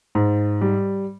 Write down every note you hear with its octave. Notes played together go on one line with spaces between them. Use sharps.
G#2
G3